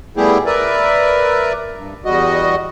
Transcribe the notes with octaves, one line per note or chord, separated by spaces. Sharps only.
G3 A3 B3 E4 G4 G#4
A#4 B4 D5 E5
G2
E2 G3 F#4 D#5